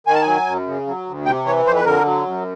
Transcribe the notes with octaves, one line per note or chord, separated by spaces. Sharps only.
D#3 G#5
A5
F#3 G#5
F#2
C#3
F#3
D2
C3 G5
E3 C#5
F2 C5
B4
D3 A#4
F#3
F#2